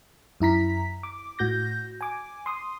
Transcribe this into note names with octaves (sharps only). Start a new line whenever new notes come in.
F#2 E4 A#5 B6
D6
A2 F#4 G6 A#6
G#5 D6
C6 D#6